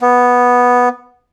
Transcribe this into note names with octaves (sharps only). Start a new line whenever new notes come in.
B3